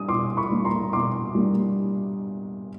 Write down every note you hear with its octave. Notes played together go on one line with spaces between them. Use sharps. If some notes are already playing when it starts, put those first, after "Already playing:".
Already playing: G3 D4 D#6
B2 C6 D6
B5 C#6
G3 A#3 D4
A#5 C6
B2 C6 D6
G3 A#3 D4